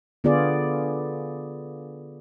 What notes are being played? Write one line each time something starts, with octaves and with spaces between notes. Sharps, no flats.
D3 B3 F4 G#4 D5